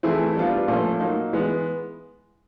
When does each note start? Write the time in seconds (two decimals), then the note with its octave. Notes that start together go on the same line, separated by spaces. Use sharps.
0.03 E3 A3 C4 E4 G#4
0.35 G3 B3 D4 F4
0.68 A#2 F3 A3 C#4
1.00 F#3 A#3 D#4
1.33 E3 G#3 B3